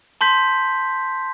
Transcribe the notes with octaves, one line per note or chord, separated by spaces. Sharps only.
A5 C6 G6 B6